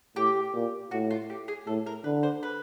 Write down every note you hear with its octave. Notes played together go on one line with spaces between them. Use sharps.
A2 G4
A#2
A2 F#4
F4
G4
G#4
A2 A4
A#4
D3 B4
C5
B4